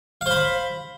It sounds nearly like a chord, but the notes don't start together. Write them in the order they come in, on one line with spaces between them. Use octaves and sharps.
F5 C5 B5